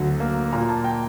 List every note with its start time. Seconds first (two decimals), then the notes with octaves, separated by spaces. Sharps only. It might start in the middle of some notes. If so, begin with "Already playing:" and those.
Already playing: D2 D3 F#3
0.20 A#3
0.53 A#2 A#5
0.69 A5
0.84 G5